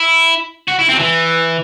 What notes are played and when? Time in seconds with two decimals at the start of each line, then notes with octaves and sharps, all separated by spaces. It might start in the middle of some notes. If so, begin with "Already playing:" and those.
Already playing: E4
0.68 F#4
0.79 E4
0.89 C4
0.94 F#3
0.99 E3